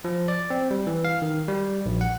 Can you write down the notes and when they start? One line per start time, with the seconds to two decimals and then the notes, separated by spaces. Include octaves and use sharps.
0.05 F3
0.28 D5
0.50 C4
0.71 G3
0.87 E3
1.05 F5
1.22 D#3
1.48 G3
1.86 A#1
2.01 F#5